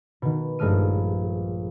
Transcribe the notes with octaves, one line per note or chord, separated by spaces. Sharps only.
B2 D#3
A#1 G2 G#3 A3 F6 D#7